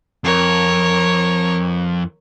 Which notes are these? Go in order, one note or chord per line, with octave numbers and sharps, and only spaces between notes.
F2 A#4 C#5